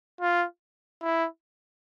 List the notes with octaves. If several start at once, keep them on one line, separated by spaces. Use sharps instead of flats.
F4
E4